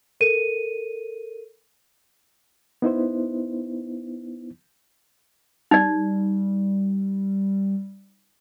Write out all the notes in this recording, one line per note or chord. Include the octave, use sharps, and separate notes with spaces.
A4 A#4 D#7
B3 D#4 E4 C5
G3 D#4 D5